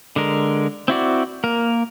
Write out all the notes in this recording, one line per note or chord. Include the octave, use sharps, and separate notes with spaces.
D3 G#3 A#4
C4 E4 F#4 D5
A#3 A#4